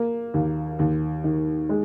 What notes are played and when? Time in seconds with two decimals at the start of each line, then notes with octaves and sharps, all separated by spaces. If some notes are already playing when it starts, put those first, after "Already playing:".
Already playing: A#3
0.34 D#2
0.79 D#2
1.24 D#3
1.69 G#3